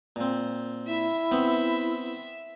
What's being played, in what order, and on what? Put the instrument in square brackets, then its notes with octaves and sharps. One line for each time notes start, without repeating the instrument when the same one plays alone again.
[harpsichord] A#2 C4
[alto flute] E4 [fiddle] E5
[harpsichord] B3 C4